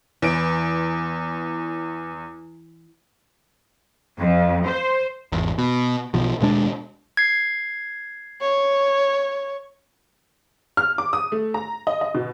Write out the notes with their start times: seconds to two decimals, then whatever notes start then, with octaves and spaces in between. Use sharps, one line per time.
0.22 E2 E3 D7
4.19 F2
4.67 C5
5.32 G#1 E2
5.58 B2
6.14 B1 B2 F3
6.41 D#1 B2 G#3 D4
7.17 G#6 C7
8.41 C#5
10.77 F6
10.98 D6
11.13 D#6
11.32 A3
11.54 A#5
11.87 D#5
12.01 D#5
12.15 B2